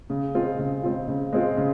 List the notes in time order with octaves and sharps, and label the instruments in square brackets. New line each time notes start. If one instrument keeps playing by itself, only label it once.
[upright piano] C#3
G#3 C4 F4
C#3
G#3 C4 F4
C#3
G#3 C4 F4
C#3